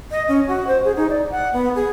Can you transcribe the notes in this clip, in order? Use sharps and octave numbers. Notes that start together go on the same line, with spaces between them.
D#5
C#4
F#4
C5
G#4
D#4
D5
F#5
B3
G#4